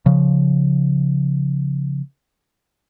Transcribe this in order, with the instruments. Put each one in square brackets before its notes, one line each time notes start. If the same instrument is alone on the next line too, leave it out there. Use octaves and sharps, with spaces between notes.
[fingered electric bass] C#3 F3